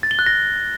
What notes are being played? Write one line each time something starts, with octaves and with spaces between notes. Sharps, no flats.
A6
G7
F#6
A#6